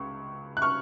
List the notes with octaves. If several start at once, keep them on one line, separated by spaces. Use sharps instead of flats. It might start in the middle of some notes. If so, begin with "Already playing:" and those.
Already playing: C#2 C#6
F#6
C#6 F6